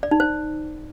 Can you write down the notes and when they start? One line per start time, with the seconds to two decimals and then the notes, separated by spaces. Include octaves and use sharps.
0.03 D5
0.11 D#4
0.20 C5